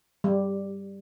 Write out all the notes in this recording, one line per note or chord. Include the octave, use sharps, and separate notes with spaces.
G3